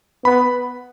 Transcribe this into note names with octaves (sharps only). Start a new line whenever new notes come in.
B3 B5